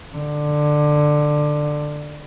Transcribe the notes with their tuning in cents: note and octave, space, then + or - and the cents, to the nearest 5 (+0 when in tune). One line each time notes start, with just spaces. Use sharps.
D3 +15